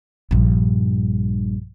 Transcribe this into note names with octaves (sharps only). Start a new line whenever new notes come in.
A#1 G2